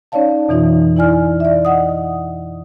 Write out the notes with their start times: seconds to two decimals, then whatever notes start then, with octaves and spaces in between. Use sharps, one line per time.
0.12 C#4 D#4 C#5 D5 F5 A5
0.48 F2 B2 E3 D#4 F4
0.96 E4 D5 G#5 F6
1.40 D5 E5
1.65 D#5 F#5 D#6